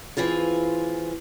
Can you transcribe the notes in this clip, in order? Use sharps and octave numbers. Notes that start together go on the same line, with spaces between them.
E3 C4 F4 G#4